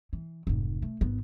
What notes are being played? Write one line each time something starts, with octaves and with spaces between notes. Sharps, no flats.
E3
F1 G#2
A3
G#1 B3